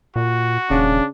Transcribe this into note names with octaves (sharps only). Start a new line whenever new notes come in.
A#2 F#4
D#1 C#3 D4